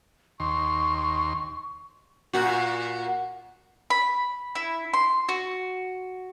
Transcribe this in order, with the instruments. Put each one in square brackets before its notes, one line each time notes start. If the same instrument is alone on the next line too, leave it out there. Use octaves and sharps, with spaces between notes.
[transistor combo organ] D#2 C6 [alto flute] C#6
[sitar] A#2 F#4
[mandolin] B5
E4
C6
F#4